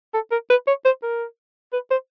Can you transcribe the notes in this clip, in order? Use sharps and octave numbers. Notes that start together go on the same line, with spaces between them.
A4
A#4
B4
C#5
C5
A#4
B4
C5